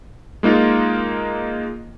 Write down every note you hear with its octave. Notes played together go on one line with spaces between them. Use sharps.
G#3 A#3 D#4 F4